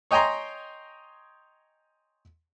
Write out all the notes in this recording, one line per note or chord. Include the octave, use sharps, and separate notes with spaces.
C#5 D#5 G5 G#5 A#5 C6